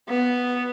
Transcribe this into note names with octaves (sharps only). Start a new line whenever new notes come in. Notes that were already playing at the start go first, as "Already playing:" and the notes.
B3